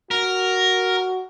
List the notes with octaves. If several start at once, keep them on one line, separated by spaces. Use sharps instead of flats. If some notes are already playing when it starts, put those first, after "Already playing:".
F#4 A#4